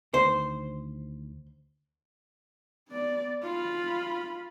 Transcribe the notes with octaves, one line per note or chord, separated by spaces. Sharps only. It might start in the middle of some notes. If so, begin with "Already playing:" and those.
D2 D#3 C5
B3 D5
F4 B5